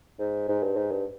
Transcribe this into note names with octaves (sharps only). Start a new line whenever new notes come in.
G#2
G#2
G2
G#2
G2